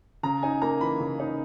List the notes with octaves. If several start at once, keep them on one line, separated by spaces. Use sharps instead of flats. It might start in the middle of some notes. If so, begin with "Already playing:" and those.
C#3 A#5
D#4 G#5
A#3 A#5
E3 B5
C#3
D#4